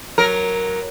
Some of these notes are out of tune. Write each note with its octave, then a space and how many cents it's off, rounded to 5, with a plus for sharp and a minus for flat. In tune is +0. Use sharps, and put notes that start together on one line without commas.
F#3 +0 A#4 +5